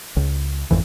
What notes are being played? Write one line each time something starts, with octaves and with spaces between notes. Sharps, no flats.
C#2
G#1 F2 E3